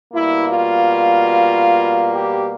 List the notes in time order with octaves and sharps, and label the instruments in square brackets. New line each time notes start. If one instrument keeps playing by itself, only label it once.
[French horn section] B2 G3 A#3 E4
F4
G4